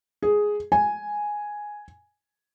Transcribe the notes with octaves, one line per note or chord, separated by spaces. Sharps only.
G#4
G#5